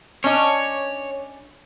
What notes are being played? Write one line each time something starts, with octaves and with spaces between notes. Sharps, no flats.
C#4 D4 C#5 D#5